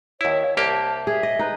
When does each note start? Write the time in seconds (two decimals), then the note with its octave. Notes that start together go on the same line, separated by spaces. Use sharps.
0.21 D#2 E4 C#5
0.57 C2 A#3 G4 A5
1.07 G#4 E5
1.23 D#5
1.39 D#4 B4